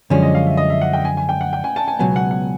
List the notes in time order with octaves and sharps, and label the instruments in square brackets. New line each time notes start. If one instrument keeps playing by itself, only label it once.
[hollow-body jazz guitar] F#2 D3 F3 G#3 C#4 [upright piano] D5
[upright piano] D#5
F5
E5
D#5
E5
F#5
G5
G#5
G#5
G5
F#5
G5
G#5
A5
G#5
[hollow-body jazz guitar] C#2 B2 F#3 B3 [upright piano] G#5
[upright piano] F#5
F#5